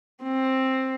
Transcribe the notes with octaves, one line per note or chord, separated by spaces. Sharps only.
C4